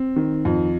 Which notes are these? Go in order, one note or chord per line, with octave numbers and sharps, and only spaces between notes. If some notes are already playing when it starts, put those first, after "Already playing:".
Already playing: C4
D#3
F2